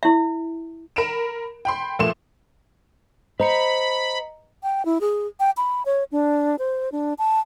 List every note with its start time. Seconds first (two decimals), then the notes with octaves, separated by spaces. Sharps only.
0.03 E4 E5
0.96 A#4 B5 D7 E7
1.65 G5 B5 C6
1.99 A#2 F3 A3 C6 E7
3.40 C5 D#5 A#5 B5 C#7
4.63 G5
4.85 E4
5.01 G#4
5.40 G5
5.57 B5
5.86 C#5
6.12 D4
6.59 C5
6.92 D4
7.18 A5